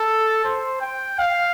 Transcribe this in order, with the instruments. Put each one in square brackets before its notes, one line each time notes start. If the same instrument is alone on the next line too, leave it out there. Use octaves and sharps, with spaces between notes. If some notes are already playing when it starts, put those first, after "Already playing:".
Already playing: [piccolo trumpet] A4
C5
G5
F5